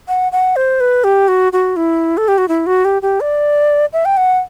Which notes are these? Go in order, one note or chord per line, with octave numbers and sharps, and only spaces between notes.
F#5
F#5
C5
B4
G4
F#4
F#4
E4
A4
G4
F#4
E4
F#4
G4
G4
D5
E5
G5
F#5